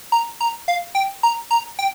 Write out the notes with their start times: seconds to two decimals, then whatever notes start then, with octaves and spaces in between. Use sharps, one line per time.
0.12 A#5
0.41 A#5
0.68 F5
0.95 G5
1.23 A#5
1.51 A#5
1.79 G5